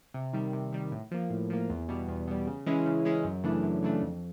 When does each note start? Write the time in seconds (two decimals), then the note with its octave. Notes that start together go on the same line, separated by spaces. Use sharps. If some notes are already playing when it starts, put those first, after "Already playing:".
0.14 C3
0.33 D#3 G3
0.53 C3
0.72 D#3 G3
0.92 A2
1.11 F3 A#3
1.30 A2
1.50 F3 A#3
1.70 E2
1.89 B2 G3
2.08 E2
2.27 B2 G3
2.47 C#3
2.66 E3 G#3 C#4 E4
2.86 C#3
3.05 E3 G#3 C#4 E4
3.25 F#2
3.43 C#3 E3 A3 D4
3.63 F#2
3.83 C#3 E3 A3 D4
4.02 F2